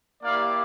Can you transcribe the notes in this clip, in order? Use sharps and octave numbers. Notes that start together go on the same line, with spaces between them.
A#3 E4 G4 D5 F5